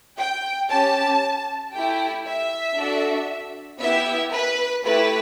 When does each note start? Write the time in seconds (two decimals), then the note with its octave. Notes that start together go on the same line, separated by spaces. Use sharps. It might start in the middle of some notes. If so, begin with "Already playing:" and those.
0.18 G5
0.69 C#4 G4 A5
1.73 A3 E4 G4 G5
2.25 E5
2.76 D4 F#4 A4
3.80 B3 E4 G4 E5
4.33 B4
4.84 A3 E4 G4 B4